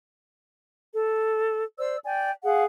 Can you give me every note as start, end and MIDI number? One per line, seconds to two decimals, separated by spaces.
0.93 1.64 69
1.78 1.97 72
1.78 1.97 74
1.78 1.97 88
2.04 2.31 74
2.04 2.31 79
2.04 2.31 80
2.43 2.64 68
2.43 2.64 77
2.43 2.64 78